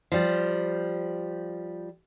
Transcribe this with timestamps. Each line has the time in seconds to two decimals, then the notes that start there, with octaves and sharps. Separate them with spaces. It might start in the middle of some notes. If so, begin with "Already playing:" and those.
0.12 F3 G3